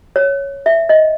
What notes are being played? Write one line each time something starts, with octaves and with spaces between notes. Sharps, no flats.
C#5
E5
D#5